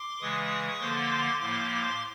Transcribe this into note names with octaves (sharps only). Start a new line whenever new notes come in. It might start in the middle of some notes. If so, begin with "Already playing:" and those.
Already playing: C6 D6
C#3 E3 G#3 C#6 D#6
D3 F3 A#3 C6 D6
A2 F3 A#3 C6 D6